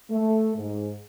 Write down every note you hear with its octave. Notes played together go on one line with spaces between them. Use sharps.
A3
G#2